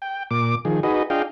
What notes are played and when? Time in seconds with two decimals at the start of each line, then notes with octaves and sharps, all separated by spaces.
0.02 G5
0.31 A#2 D6
0.65 D#3 F3 G#4
0.83 D#4 F#4 G#4 B4 D#5
1.10 D4 F4 G#4 D#5 F5 G5